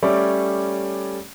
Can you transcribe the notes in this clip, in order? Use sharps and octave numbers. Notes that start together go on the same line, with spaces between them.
G3 A3 C#4 C#5 D5 E5